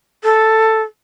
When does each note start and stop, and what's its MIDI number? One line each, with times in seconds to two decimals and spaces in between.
0.24 0.81 69